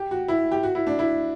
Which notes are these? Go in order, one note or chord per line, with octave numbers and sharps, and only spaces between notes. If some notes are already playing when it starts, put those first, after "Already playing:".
Already playing: G4
F#4
E4
G4
F#4
E4
D4
E4